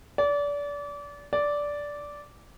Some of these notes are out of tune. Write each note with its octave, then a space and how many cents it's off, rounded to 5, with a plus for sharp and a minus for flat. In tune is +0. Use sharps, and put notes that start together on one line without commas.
D5 -30
D5 -10